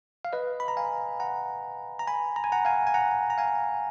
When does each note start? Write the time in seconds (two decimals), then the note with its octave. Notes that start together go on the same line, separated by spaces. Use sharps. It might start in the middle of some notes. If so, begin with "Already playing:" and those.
0.25 F5
0.33 B4 D#5
0.60 B5
0.68 A#5
0.77 F5 G#5
1.20 F#5 A#5
1.99 A#5
2.07 G#5 B5
2.36 A#5
2.44 G#5
2.52 F#5 A#5
2.65 F5 G#5
2.87 G#5
2.94 F#5 A#5
3.30 A#5
3.38 F5 G#5